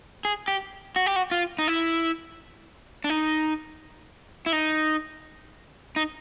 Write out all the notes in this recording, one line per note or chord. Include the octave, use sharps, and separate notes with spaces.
G#4
G4
F#4
G4
F#4
F4
D#4
E4
D4
D#4
E4
D#4
D#4